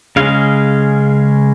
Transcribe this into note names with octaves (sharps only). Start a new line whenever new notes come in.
C#3 G#3 C#4 F5